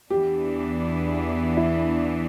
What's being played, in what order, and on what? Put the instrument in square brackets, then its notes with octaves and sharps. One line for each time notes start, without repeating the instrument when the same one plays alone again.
[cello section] E2 E3 B3 D4 [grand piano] G4
[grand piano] E4